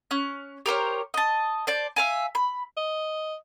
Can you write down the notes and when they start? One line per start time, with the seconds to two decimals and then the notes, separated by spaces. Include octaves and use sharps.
0.11 C#4 F#6
0.66 G4 A#4 C5 C#5
1.14 D#5 A5
1.67 C5 D5 A5
1.96 E5 F5 G#5
2.35 B5
2.77 D#5